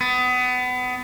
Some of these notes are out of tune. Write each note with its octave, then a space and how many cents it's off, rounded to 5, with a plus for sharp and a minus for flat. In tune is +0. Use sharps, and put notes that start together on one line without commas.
B3 +25